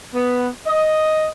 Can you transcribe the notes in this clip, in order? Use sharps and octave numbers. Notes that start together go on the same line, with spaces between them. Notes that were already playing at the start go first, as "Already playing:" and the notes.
B3
D#5